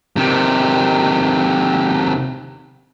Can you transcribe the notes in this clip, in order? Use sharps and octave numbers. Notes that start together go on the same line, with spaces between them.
C3 D#3